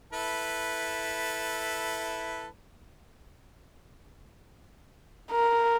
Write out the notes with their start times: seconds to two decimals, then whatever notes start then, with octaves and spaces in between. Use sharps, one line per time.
0.13 E4 A4 B4
5.31 A#4